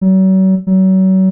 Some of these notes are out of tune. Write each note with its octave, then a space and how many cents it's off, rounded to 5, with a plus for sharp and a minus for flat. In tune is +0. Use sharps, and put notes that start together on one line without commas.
F#3 +40
F#3 +35